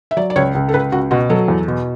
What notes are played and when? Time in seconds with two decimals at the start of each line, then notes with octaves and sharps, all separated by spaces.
0.11 E5
0.17 F#3 D5
0.30 D5
0.36 C#2 C#5
0.55 C#2
0.69 A4
0.74 C#2 B4
0.92 C#2 F#4
1.11 B2 F#4
1.30 F#3 A4
1.48 E2
1.68 B2